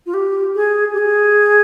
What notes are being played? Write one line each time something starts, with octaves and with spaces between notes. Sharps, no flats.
F4
G4
G#4
G4
G#4